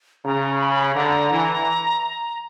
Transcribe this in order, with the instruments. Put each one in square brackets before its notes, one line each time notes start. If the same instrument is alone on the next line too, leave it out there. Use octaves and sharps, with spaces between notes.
[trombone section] C#3 [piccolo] A#5
[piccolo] B5
[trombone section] D3 [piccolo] A#5
[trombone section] E3